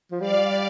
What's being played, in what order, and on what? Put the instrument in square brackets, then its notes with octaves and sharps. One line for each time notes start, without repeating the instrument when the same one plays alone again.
[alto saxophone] F3
[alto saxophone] G3 [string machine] D5 F5